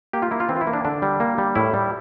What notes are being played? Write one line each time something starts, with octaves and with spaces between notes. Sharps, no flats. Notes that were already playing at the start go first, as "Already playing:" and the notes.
A#3 G4
F4
A#3 E4
F4
E3 C4
F4
E4
A#3
D4
D3 D4
G3
A#3
G3
A2 E4
G3